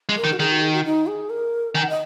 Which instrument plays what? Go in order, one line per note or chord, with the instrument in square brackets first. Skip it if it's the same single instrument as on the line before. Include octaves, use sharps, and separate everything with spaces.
[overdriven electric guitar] G#3
[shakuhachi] A#4
[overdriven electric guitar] D#3
[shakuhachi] F#4
[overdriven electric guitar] D#3 [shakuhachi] G#4
[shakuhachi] F#4
G#4
F#4
D#4
G#4
A#4
[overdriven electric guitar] D#3 [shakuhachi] G#5
[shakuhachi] F#5
D#5